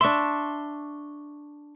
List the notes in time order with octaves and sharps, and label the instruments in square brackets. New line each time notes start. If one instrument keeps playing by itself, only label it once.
[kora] D4 E5 [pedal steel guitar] C6 C#6